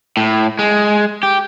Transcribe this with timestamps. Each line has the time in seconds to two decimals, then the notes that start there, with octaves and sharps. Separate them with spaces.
0.17 A2
0.59 G#3
1.23 G4